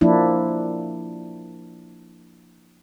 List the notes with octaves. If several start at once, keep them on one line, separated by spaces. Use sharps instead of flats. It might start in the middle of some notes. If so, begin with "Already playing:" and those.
F3 A#3 D4 E4